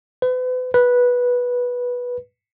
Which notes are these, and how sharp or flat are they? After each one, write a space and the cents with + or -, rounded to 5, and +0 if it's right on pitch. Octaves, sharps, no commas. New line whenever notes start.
B4 +40
B4 -10